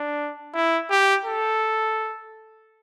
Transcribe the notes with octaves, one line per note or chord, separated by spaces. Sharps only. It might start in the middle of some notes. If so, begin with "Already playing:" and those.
Already playing: D4
E4
G4
A4